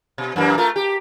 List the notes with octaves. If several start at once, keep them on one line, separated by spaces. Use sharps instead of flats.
B2
F#2 E3 A#3
A3 F4 A#4
G4